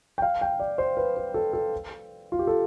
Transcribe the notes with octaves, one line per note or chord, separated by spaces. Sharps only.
G5
F5
G5
D5
C5
B4
B4
A4
A4
F4
G4
A4